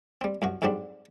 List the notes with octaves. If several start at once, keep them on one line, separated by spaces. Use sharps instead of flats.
G3 C4
C2 F#2 F#4
F2 G#2 F#3 G3 C4 D4